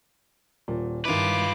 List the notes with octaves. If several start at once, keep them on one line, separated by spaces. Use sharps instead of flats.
D#1 A#2
G2 D#3 E4 F4 B4 D6